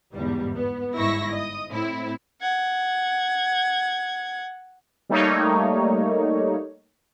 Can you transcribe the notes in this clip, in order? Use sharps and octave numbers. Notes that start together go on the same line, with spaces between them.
G1 E2 G#2 G3
B3
G1 G#2 E4 C#6 E6 A#6
D#5 D#6
A2 C4 E4
F#5 G#6
G3 A3 A#3 D#4 C#5